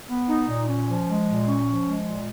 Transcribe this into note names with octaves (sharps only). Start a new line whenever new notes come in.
B3
D#4
A#2
C#4
F3
G#3
A#2
C#4
F3
G#3
A#2